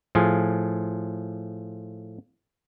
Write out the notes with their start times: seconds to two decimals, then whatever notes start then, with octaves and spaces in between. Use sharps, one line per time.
0.15 A2 F3 F4 G#4